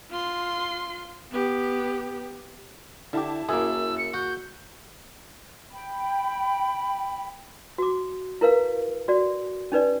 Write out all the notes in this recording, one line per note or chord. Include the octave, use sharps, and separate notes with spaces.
F4 C6
B3 G4
D3 E4 G4 A5
F#2 A#3 G#4 E6
C#7
F#4 G6
G5 B5
F#4 D6
E4 A#4 B4 F5
F#4 D5
C#4 D#4 B4 D5